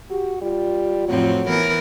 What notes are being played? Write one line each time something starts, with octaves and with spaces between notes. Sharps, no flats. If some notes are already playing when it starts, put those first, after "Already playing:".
F#4 G4
G3 F4
F2 A2 F#3 C4
E3 B3 A#4 C#5